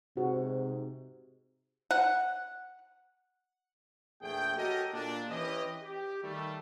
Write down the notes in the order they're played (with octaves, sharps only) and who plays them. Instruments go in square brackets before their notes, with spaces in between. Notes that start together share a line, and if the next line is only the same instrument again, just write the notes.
[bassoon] G#2 [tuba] C3 [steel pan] F#4
[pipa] F#5
[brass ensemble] A#1 E2 A3 G#4 G5
F#4 G4 A4 A#4 C#5 D#5
A#2 D4
E3 C#4 G4 D#5
G4
D#3 G3 A3